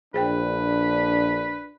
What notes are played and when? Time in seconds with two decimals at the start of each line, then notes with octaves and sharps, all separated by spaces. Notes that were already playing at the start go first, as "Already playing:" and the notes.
0.14 A#1 D4 G#4 B4 C5 G5